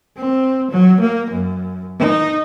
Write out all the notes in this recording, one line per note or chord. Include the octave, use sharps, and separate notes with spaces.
C4
F#3
A#3
F#2
D#4